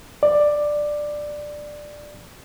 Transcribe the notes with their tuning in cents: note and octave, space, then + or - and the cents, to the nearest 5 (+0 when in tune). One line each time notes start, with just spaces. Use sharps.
D5 +10